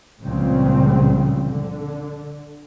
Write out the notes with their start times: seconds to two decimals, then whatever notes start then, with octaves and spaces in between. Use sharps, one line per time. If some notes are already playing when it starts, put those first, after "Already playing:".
0.22 C#2 A#2 C#3 F3 G3 C4
1.48 D3